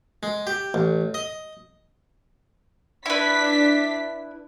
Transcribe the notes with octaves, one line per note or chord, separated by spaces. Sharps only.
G#3
G4
A1
D#5
D4 E4 B4 B6